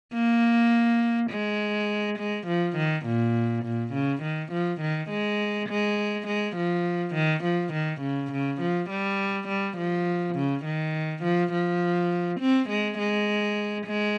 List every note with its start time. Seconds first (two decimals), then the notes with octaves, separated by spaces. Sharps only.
0.14 A#3
1.31 G#3
2.19 G#3
2.47 F3
2.77 D#3
3.06 A#2
3.65 A#2
3.94 C#3
4.23 D#3
4.52 F3
4.81 D#3
5.10 G#3
5.69 G#3
6.27 G#3
6.57 F3
7.15 D#3
7.44 F3
7.73 D#3
8.02 C#3
8.32 C#3
8.61 F3
8.90 G3
9.49 G3
9.77 F3
10.36 C#3
10.65 D#3
11.24 F3
11.53 F3
12.41 C4
12.69 G#3
12.99 G#3
13.86 G#3